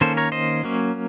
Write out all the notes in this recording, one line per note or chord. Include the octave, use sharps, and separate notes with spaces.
D#3 A#3 C#4 A4 C5
A#4 C#5
C5 D#5
F#3 A#3 C#4